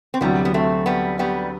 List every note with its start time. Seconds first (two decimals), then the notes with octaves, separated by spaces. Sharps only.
0.14 C4
0.21 D2 C3 F#3 G3 B3
0.45 B3
0.54 A3 C4
0.86 G3 B3
1.19 G3 B3